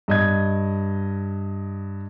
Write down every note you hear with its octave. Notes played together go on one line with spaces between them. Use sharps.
G2 D#5 G#6